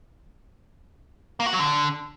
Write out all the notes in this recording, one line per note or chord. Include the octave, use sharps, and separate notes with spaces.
A#3
F#4
F#3
D3